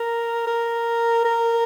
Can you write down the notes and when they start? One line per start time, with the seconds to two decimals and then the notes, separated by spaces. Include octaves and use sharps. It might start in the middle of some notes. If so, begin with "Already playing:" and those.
Already playing: A#4
0.47 A#4
1.24 A#4